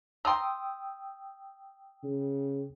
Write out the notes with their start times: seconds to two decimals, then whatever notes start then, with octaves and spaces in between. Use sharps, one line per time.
0.25 G5 A#5 C6 D#6 E6
2.03 C#3